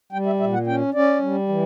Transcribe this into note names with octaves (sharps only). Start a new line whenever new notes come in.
G3 G5
E5
A#2 E5
F#5
C#4 G5
C#4 D5
G3
E3